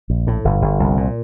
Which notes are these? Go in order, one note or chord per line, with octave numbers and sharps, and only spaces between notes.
A#1
A2
G1
G1
C2
A#2